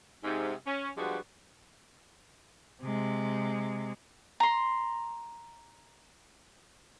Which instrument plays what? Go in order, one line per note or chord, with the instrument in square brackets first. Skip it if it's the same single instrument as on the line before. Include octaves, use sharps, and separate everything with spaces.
[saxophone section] G#2 C3
C#4
F3 G3 G#3 B3 D4 F#4
[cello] C3 G#3
[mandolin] A#5 C6